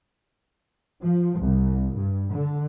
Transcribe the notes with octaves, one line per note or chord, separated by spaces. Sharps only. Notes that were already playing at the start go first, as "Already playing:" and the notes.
F3
C2
G2
D3